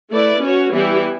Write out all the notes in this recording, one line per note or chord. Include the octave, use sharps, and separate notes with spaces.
A3 E4 B4 D5
C#4 F#4 C#5
E3 G3 B3 E4 G4